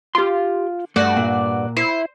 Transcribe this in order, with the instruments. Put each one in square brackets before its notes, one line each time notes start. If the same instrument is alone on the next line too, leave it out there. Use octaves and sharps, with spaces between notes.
[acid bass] F4 [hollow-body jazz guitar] G4 C6
[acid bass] G2 [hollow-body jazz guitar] A3 [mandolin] F#4 D5
[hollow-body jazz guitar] A#2
[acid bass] E4 [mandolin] C5